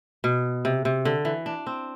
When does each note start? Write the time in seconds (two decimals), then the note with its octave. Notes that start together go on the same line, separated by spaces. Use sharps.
0.24 B2
0.65 C3
0.85 C3
1.05 D3
1.25 E3
1.46 D4
1.66 C4